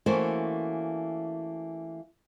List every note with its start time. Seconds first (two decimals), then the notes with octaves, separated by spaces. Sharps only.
0.06 E3 A3 A#3 C#4 F#4 C5